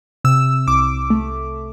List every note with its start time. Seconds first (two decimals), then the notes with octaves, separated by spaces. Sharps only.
0.24 C3 E6
0.67 C2 D6
1.10 A3